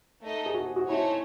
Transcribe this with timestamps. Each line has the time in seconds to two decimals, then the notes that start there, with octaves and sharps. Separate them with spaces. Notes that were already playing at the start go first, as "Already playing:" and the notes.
0.22 A3 D#4 A4 D#5
0.46 G#4
0.54 F#4
0.76 F#4
0.88 A3 C4 D#4 E4 G#4 C#5